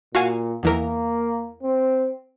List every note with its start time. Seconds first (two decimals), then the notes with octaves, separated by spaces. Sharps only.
0.15 A#2 F#4 F5 G#5
0.63 E2 E3 A#3 A#4
1.63 C4